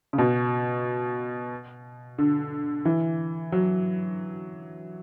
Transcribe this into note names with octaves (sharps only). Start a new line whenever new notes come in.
C#3
B2
D3
E3
F#3